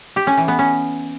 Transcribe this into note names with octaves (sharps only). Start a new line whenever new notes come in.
G4
C#4
E3
B3
C#4